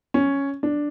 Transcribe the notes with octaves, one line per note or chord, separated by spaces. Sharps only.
C#4
D4